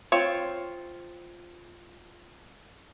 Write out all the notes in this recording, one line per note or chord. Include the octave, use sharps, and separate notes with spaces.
C4 F4 C#5